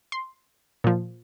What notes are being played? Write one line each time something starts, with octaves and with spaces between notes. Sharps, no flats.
C6
A#2 F3